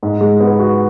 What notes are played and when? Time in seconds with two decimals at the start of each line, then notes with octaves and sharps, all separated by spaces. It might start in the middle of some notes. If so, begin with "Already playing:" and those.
0.03 G#2
0.21 G#3
0.40 B3
0.59 F#4